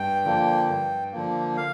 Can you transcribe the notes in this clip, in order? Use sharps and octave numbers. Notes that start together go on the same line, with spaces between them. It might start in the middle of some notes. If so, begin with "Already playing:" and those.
Already playing: G2 G5
D3 F3 A#3
G2
D3 F3 A#3
F5